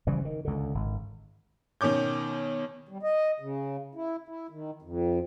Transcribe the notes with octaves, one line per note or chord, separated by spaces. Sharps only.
C#3 E3 F3 G3
D#3
C#2 D3
G#1
B2 D#3 C#4 D6 G6
G3
D#5
C#3
E4
E4
D#3
F2